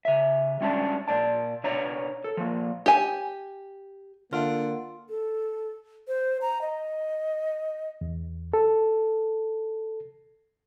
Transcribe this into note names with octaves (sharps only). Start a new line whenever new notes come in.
C#3 E5
G3 G#3 C#4 D4 A5
A#2 D5 A5
B2 D4 C#5 A#5
A4
F3 A#3
G4 G#5
D3 A#3 F4
A4
C5
A#5
D#5
E2
A4